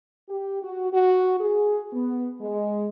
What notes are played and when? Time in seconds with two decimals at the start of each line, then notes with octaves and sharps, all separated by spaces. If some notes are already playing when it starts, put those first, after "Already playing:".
0.29 G4
0.63 F#4
0.92 F#4
1.40 G#4
1.93 B3
2.41 G#3